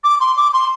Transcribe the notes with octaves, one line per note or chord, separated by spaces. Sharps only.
D6
C6
D6
C6